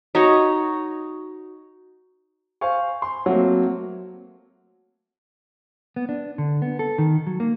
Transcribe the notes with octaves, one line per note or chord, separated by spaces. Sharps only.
D#4 F#4 C#5 D#5
C5 F5 G#5 C#6
C6
F#3 A3 A#3 C4
B3
D4
D3
B3
A4
D#3
F#3
A#3